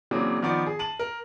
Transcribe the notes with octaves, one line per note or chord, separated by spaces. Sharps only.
C#3 E3 F#3 A#3 C4 D4
D#3 F3 B3 D5
G#4
A5 D#7 F#7
A#4